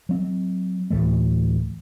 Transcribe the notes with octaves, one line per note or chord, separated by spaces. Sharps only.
F#3 C4
D2 A2 E3 A3